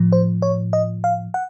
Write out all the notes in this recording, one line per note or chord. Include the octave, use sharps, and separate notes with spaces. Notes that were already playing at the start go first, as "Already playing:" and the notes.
Already playing: A2 F3
C5
C#5
D#5
F5
F#5